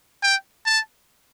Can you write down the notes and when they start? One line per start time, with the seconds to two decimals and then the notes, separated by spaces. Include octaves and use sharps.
0.23 G5
0.66 A5